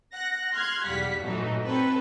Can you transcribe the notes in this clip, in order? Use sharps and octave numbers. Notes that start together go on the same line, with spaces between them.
F#5 F#6 A#6
C6 F6 F#6 G#6
B1 E2 G3 F5 F#5 B6
G2 A#2 E3 F#3 A3 D#4
C4 F#4 A4 B4 C#5